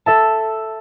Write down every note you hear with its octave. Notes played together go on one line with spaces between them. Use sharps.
A4 E5 A5